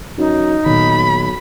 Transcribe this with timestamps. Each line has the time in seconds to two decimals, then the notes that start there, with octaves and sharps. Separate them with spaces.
0.18 F#2 D#4
0.66 B1 A#2 D#3 B5